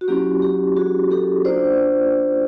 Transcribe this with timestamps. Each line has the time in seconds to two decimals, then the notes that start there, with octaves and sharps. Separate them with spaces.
0.01 F#4
0.08 F#3 A#3 C#4 E4 G4
0.42 G4
0.77 F#4 G#4
1.11 G4 A4
1.45 A#3 D4 F4 C5 D5